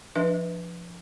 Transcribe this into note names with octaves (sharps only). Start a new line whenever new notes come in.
F3 D4 B4 E5